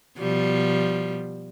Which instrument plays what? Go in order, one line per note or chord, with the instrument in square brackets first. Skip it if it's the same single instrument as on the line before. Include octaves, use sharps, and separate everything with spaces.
[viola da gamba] B2 F3 G3